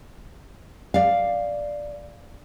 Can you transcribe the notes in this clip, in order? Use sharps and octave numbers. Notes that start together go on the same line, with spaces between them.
D5 F5